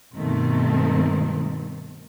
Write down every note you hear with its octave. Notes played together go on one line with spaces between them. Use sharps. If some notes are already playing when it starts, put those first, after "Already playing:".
G2 B2 D#3 A3 C4